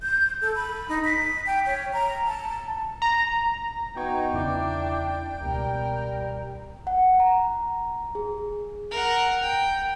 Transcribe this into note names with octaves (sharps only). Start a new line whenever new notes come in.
G6
A4
B5
D#4
B6
G5
C#5
A#5
A5
A#5
B3 D#4 F#4 G5 C#6 G#6
E2 C#3 D4 E4 D6
C#2 B2 G3 A#4
F#5
A#5
G#4
A#4 F#5
G5